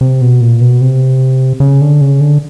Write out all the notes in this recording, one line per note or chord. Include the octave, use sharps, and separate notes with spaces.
C3
B2
A#2
B2
C3
C#3
D3
C#3
D3